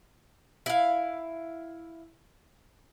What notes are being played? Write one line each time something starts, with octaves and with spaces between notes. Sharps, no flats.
E4 F5